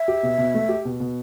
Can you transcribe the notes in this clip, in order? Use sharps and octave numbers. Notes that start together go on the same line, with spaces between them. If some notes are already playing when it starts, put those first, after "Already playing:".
Already playing: E5
G4
B2
B2
A3
G4
B2
B2